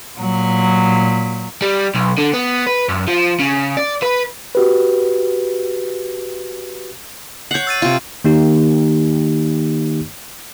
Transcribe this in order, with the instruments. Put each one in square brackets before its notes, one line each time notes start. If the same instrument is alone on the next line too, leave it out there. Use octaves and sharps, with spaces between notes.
[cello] A#2 F#3
[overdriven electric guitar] G3
B1
D3
B3
B4
F#2
F3
C#3
D5
B4
[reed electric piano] F#4 G4 B4
[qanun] C#5 F#5 [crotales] G6 C7
[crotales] E6 A6 D#7
[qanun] C3 F4
[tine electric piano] D#3 A#3 D#4 G4